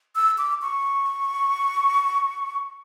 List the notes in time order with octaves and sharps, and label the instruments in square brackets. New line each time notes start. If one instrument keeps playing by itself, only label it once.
[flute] E6
D6
C#6